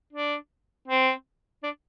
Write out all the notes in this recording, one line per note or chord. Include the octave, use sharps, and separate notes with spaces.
D4
C4
D4